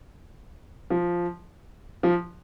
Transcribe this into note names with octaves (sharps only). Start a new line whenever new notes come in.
F3
F3